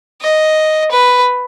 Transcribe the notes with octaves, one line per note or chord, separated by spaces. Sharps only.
D#5
B4